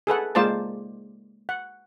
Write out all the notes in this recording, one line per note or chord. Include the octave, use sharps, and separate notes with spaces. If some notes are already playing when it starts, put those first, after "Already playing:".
G#4 A4 B4 F#5
G#3 A#3 F4 C5 D5 A5
F#5